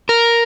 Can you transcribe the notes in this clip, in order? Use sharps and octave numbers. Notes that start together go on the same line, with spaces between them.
A#4